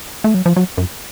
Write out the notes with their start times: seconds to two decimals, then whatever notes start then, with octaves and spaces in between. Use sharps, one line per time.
0.24 A3
0.34 F#3
0.46 F3
0.56 F#3
0.78 F#2